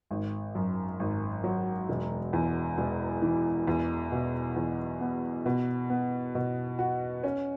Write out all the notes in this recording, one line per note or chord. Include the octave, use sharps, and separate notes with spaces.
G#1
F#2
G#1
F#3
E1
E2
E1
E3
E2
B2
E2
B3
B2
B3
B2
F#4
C#4